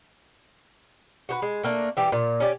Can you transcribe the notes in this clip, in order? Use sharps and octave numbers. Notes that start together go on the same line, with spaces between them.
F#4 G4 B4
G#3
A3 A#3 D4
E3 G4 D5
A#2
C#4 G4 D5